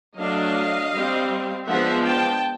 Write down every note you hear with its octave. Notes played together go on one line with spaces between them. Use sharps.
F#3 A3 D4 D#5 F5
G3 C4
F3 G#3 B3 D4 E5 F#5
G5 A5